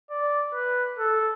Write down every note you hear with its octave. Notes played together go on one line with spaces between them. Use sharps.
D5
B4
A4